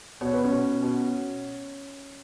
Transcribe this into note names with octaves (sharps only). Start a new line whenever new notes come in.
B2 C#5
B4
C#4 C#5
B2
B2